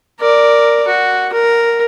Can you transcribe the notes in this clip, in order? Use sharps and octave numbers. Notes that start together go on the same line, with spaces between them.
A#4 D5
F#4
A#4